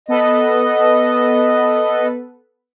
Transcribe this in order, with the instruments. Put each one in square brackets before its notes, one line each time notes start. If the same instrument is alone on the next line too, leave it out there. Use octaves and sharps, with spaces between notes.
[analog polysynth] B3 A4 B4 [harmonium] D#5